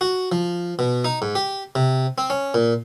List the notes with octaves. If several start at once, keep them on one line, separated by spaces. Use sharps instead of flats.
F#4
F3
B2
D#4
G#2
G4
C3
C4
C#4
A#2